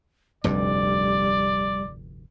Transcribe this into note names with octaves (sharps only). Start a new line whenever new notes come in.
F1 D2 G2 G3 D5